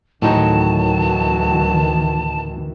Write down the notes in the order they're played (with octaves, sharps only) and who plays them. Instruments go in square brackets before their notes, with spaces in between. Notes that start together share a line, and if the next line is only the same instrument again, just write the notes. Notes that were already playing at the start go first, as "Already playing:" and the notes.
[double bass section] D2 D#3 E3 [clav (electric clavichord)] A2 D#4 [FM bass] F#3 [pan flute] A5